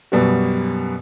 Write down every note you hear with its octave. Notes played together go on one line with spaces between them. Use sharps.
F#2 B2 G3 B3 F#4